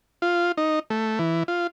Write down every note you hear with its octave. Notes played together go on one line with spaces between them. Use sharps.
F4
D#4
A3
E3
F4